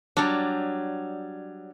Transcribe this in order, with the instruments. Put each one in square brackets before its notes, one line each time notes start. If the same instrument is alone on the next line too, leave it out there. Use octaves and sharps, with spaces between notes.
[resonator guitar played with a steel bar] F#3 G3 [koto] D4